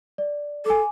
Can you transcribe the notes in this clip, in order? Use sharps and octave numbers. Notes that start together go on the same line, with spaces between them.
D5
A4 G#5 D6